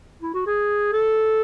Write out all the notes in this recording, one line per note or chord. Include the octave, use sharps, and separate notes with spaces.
E4
F#4
G#4
A4